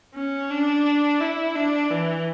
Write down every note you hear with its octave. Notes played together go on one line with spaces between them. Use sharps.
C#4
D4
E4
D4
E3